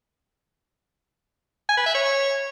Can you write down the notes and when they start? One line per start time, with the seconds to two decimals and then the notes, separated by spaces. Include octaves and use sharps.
1.69 G#5
1.77 B4
1.86 E5
1.95 C#5